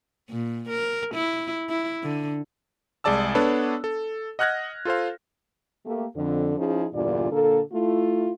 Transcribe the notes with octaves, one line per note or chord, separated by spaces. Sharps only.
A#2
A#4
E4
E4
D3
C2 G#3 G#4 D5 A5 E6
B3 D4 A4 B4 C#5 A5
A4
D#5 F#5 F6 F#6 G#6 A#6
F4 A4 C5 F5
A3 A#3 G4
F2 D3
F3 C#4 D#4 E4 G#4
E2 G2 A#2 D3 F4 D5
A#2 D3 A#3 A4
A3 E4 F4